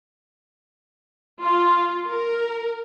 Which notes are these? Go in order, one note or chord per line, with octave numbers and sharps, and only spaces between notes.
F4
A#4